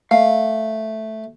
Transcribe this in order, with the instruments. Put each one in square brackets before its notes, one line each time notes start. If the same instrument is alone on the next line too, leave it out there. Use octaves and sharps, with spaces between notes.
[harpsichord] A3 [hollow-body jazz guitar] F5